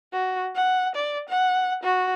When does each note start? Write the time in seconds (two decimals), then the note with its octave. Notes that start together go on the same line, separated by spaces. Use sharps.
0.13 F#4
0.56 F#5
0.95 D5
1.29 F#5
1.84 F#4